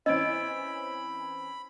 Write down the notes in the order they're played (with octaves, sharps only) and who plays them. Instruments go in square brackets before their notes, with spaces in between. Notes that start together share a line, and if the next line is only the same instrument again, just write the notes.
[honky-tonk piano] E3 C4 C#4 [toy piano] D#5 [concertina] B5 [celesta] E6 G#6 D7